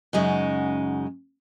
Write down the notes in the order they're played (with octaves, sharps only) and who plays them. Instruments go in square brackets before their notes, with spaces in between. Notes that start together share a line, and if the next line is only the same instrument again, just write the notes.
[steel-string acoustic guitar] F#2 C#3 G#3 D#4 F#4